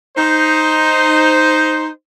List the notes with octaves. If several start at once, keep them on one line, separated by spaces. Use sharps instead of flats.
D#4 C5